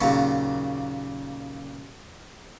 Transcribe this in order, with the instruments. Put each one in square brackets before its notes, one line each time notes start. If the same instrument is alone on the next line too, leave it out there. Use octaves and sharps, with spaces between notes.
[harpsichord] D#2 A#2 C#3 F#3 A#3